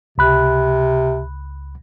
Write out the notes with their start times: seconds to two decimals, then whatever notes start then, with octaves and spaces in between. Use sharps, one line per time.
0.18 C#2 C3 B5 F#6